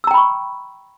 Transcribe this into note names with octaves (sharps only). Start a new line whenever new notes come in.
G5 A#5 B5 C#6 E6